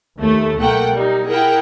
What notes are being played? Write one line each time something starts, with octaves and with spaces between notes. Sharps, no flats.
D#2 A3
B1 A3 A#3 F#5 G5
G3 D#4
E4 G#4 A#4 F#5 G5